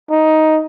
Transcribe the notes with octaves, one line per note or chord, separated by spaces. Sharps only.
D#4